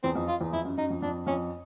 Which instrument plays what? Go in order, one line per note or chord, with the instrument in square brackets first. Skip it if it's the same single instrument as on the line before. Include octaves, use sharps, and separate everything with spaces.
[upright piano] E2 [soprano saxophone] C4
[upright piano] F2
[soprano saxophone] F4
[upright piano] E2
[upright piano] F2 [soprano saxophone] E4
[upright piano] F#2
[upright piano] F#2 [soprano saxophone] D#4
[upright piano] F2
[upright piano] F2 [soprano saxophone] D4
[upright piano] F2 [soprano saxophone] C#4